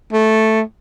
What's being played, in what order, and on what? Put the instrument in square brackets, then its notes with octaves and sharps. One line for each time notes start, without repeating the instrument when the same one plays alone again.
[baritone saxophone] A3